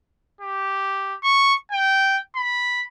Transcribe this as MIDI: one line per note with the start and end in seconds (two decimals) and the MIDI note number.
0.41 1.15 67
1.23 1.54 85
1.72 2.19 79
2.36 2.83 83